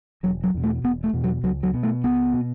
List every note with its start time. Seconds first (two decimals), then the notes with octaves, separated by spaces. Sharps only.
0.23 E1 F#3
0.44 F#3
0.54 E2 B2
0.64 A3
0.84 E1 B3
1.04 A3
1.13 E2 B2
1.24 F#3
1.43 C#2 F#3
1.63 F#3
1.74 B2
1.83 A3
2.04 C#2 B3
2.34 B2